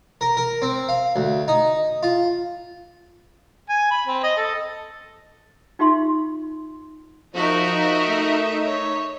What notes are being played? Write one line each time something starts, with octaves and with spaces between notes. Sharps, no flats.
A#4
A#4
C4
F5
D2
D#4
F4
G#5
B5
C4
D#5
A4
D#4 F4 G4 E5 C6
F3 D#4 F#4 A#4 D#5 E5
A3
C#5